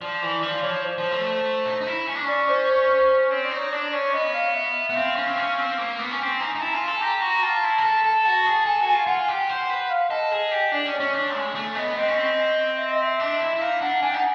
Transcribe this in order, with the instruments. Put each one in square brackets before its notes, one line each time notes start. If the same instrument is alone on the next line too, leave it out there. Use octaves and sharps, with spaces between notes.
[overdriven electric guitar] F3 [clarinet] D5
[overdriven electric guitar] E3
[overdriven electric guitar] F3 [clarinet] D5
[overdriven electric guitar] F3 [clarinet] C#5
[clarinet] C5
[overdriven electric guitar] F3
A3
D#4
D#4
E4
C#4
D4
[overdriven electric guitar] C#4 [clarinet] D5
[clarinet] C5
[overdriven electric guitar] C4 [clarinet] C#5
[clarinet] D5
[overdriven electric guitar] D#4
[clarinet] C#5
[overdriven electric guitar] D4 [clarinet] D5
[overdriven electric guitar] C#4 [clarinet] C#5
[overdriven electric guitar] B3 [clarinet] D#5
[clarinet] F5
E5
[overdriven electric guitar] B3
[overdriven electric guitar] C4 [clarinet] F5
[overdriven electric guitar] C#4
C4
C#4
C4
A#3
B3
C#4
[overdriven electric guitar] C4 [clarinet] G#5
[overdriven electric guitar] D#4 [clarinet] A#5
[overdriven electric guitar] D#4
[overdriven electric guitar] E4 [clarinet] A5
[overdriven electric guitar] F4 [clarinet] G#5
[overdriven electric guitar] A4 [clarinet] A5
[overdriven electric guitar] G4 [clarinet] A#5
[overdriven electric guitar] F#4
[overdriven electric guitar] F4 [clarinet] A5
[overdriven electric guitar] E4
A#4
A4
A4
[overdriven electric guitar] F#4 [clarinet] A5
[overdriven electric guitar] G#4
[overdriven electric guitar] A4 [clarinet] G#5
[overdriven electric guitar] F#4
[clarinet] G#5
[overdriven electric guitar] F4
[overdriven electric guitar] F4 [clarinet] F#5
[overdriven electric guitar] G4
C5
B4
[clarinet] F5
[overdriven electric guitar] A4 [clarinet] D#5
[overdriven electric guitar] G#4
G4
[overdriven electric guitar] D4 [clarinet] D5
[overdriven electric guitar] C#4
[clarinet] C#5
[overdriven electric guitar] C#4
D4
G#3
A3
[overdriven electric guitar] B3 [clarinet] D#5
[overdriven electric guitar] C4 [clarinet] D#5
[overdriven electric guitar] C#4
C4
[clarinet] E5
D#5
E5
[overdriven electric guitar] D4
E4
E4
[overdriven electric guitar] D#4 [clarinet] F5
[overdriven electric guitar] D4 [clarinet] F#5
[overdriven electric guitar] D4 [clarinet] G#5
[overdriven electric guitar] D#4 [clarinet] G5
[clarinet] F#5